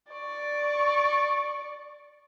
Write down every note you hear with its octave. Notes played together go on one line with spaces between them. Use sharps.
D5 C#6